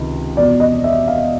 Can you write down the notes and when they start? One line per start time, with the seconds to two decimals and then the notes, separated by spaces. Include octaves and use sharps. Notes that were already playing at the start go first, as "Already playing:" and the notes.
Already playing: C#2 C3 D#3
0.37 E2 B2 D5
0.60 D#5
0.84 E5
1.08 F5